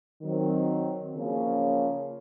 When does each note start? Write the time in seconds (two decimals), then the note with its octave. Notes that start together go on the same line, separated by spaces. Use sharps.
0.22 D#3 F#3 C4
1.15 C#3 F3 A#3 C#4 F4